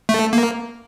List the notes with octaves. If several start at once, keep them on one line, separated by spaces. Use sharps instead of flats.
A3
A#3